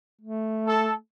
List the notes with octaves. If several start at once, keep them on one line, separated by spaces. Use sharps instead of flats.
A3
A4